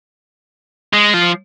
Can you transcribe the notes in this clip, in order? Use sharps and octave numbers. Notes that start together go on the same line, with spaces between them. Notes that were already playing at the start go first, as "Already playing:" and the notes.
G#3
F3